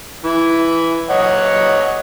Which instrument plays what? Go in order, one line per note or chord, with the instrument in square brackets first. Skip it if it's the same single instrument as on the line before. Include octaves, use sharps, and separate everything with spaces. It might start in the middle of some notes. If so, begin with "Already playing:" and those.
[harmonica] E3 E4
C#5 D#5 F#5